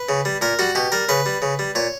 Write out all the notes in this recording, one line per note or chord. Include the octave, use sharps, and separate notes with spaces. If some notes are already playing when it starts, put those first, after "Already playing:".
Already playing: B4
C#3
G3
A#2 A#4
G3 F#4
B2 G4
G3 A#4
C#3 B4
G3
C#3
G3
A#2 C#5